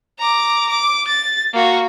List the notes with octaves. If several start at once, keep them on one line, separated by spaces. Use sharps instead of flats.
A#5 D6
D6
A6
A#3 F#4